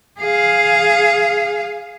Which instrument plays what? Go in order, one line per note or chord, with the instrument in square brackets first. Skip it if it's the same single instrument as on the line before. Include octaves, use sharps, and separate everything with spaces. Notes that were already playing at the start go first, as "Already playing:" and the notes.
[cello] G#4 F5